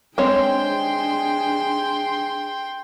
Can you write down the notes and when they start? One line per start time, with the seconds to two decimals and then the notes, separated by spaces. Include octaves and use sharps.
0.18 G#3 C4 D4 G#4 C#5 G5 C6